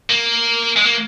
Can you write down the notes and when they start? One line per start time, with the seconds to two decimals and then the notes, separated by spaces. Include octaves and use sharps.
0.10 A#3
0.77 G#3
0.85 A#3